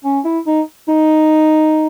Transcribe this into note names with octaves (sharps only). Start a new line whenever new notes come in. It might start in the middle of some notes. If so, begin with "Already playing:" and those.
C#4
E4
D#4
D#4